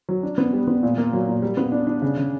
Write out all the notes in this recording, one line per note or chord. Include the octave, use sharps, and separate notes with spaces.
F#3
D4
B3
G3
B3
A#2
A#3
F#3
A#2
G3
B3
D4
D4
C#3
C#3